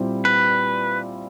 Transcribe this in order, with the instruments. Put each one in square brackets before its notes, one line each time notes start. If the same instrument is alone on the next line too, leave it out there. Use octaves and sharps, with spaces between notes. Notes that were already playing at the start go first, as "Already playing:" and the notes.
Already playing: [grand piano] A#2 G3 C4 E4 G4
[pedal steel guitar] B4